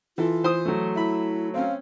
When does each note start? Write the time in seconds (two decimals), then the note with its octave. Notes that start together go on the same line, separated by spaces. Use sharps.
0.18 E3 F4 A4
0.43 E3 C5 D#6
0.65 F#3 A3
0.95 E4 E5 B5
1.54 C4 C#4 F5